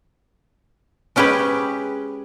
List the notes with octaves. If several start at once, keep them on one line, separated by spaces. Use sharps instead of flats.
G#3 C#4 G4 G#4 B4